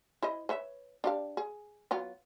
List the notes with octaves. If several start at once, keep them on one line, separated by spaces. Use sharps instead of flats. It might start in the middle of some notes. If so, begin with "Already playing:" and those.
E4 C5 D#5
B4 C#5 E5
D4 G4 F5
G#4
F#3 B3 F4